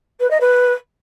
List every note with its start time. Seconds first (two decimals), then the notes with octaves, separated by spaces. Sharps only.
0.20 B4
0.30 D#5
0.40 B4